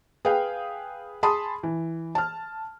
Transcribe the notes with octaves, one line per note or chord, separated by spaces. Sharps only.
G#4 B4 F5 G5
G#4 A5 B5 C6 D#6
E3
A5 F6